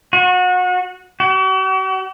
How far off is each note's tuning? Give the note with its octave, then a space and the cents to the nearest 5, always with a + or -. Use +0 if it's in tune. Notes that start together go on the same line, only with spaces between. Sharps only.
F#4 -30
F#4 +45